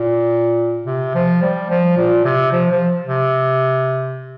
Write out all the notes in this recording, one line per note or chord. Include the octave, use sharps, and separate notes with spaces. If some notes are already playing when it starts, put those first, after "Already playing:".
Already playing: A#2
C3
F3
G3
F3
A#2
C3
F3
F3
C3